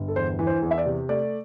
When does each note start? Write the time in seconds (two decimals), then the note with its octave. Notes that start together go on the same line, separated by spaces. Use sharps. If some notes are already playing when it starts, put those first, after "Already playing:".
Already playing: G1
0.08 A4
0.16 E2 C5
0.39 E3
0.47 C5
0.62 E2
0.71 E5
0.78 D5
0.86 C3
1.09 A3 D5